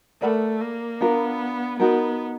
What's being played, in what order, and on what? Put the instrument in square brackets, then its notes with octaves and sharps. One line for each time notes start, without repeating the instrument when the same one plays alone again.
[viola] A3 [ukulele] A#4 D5 F#5 B5
[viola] A#3
[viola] B3 [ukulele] D4 F4 A#4
[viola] B3 [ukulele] D#4 F#4 A#4